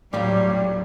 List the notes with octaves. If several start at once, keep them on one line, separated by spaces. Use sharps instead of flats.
D#1 A2 F#3 G3 F4 G4